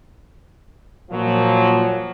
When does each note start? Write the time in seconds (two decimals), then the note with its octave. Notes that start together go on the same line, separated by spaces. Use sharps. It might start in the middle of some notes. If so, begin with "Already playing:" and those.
1.11 A#2 F3 F#3